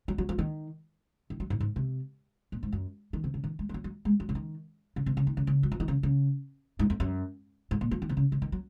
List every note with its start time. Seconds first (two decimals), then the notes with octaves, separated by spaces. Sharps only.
0.08 F#3
0.18 F#3
0.29 F3
0.39 D#3
1.30 D#3
1.40 F#3
1.50 G#2
1.60 G#2
1.76 C3
2.52 A#2
2.63 G#2
2.72 F#2
3.13 D#3
3.24 C3
3.34 C#3
3.44 D#3
3.59 G#3
3.69 G#3
3.74 F#3
3.84 F#3
4.05 G#3
4.20 F#3
4.29 C#3
4.35 D#3
4.96 C#3
5.06 C3
5.17 C#3
5.27 D#3
5.37 C#3
5.47 C#3
5.63 F#3
5.72 F3
5.80 D#3
5.88 C#3
6.03 C#3
6.79 G#2
6.90 F2
7.00 F#2
7.71 G#2
7.81 A#2
7.91 F3
8.02 D#3
8.09 C3
8.17 C#3
8.32 C#3
8.42 D#3
8.52 F#3